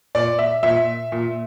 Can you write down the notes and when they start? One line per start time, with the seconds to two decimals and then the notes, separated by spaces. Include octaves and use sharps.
0.15 A#2 D5
0.39 E5
0.63 A#2 E5
1.12 A#2